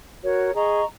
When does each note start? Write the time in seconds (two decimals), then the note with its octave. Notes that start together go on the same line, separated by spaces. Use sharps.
0.23 F#4 A#4 C#5
0.54 G#4 D#5 A#5 C#6